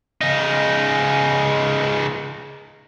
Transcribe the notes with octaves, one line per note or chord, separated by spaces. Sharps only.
C#3 D#4